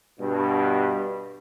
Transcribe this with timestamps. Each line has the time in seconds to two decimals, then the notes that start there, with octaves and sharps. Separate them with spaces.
0.19 G2 B2